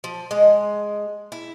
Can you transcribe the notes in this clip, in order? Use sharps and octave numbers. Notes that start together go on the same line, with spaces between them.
F3
G#3 D#5
E4